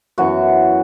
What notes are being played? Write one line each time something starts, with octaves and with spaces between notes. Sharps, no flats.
F#2 E3 B3 F#4